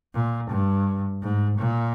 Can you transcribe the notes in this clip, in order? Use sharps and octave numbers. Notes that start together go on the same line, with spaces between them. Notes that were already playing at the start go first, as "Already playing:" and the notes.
A#2
G2
G#2
A#2